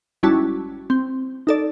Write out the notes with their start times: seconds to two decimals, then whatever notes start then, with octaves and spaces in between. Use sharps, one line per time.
0.23 G#1 G3 C#4 E4 F#4 A5
0.90 C4
1.47 D#4 A4 D5